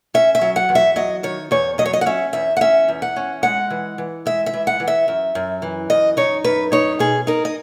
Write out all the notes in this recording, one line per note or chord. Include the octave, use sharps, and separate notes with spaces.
C#4 E5
E5
F#3
F#5
E2
E5
F#3 D#5
D#3 C#5
E2 C#5
F#3 D#5
C#5
D#5
F#5
C#4 E5
E2 E5
F#5
C#4 E5
E2
F#5
C#4
G#3 F#5
E3
E3
G#3 E5
E5
E3
F#5
E3
E5
F#2
F#2
E3
F#2 D#5
D#4 C#5
F#2 B4
D#4 C#5
B2 G#4
D#4 A#4
D#5